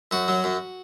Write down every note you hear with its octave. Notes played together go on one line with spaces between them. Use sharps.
F#2 F#4
F#3
F#2